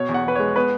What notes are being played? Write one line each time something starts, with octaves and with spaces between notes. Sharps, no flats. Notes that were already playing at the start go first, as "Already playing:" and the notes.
Already playing: B2 C#5
E2
F#5
E2 B4
G#3 C#5
B3 B4